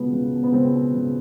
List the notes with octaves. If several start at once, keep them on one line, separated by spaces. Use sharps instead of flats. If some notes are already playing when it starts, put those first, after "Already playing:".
Already playing: C#2 B2 B3
C#2
B2
B3
C#2 C4
B2
C#2